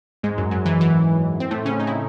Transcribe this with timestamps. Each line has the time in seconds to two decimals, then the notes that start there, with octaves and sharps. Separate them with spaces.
0.23 G#2 G#3
0.38 F#2 F#3
0.51 F#2 F#3
0.66 E3
0.81 E3
1.40 C4
1.51 A2 A3
1.65 C#3 C#4
1.80 D#4
1.87 E4